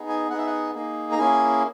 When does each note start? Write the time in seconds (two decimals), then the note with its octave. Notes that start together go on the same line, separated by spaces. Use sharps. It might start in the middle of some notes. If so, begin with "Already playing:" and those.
Already playing: B3 D#4 G#4
0.09 G#5
0.30 B3 D#4 G#4 F#5
0.38 E5
0.47 F#5
0.75 A#3 D#4 G#4
1.11 A#5
1.18 A#3 C#4 E4 G#4 G#5